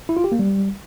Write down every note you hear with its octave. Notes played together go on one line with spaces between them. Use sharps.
E4
F4
G4
A#3
G3